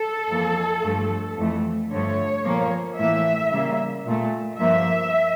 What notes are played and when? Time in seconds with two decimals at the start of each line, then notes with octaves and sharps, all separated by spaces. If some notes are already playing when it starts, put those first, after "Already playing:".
Already playing: A4
0.29 F2 E3 A#3
0.83 G2 F3 A3
1.37 F2 E3 A3
1.91 G2 D3 F3 A3 C#5
2.45 A#2 F3 A#3
2.98 A2 E3 A#3 E5
3.51 C#3 G3 A#3
4.05 A#2 A3
4.59 G2 F3 A#3 E5